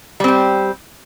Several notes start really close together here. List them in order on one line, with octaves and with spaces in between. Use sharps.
G3 C4 G4